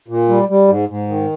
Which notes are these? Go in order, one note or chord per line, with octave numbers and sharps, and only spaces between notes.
A#2
G3
G3
G#2
G#2
D#3